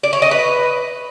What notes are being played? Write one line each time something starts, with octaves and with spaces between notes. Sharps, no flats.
D5
C#5
D#5
B4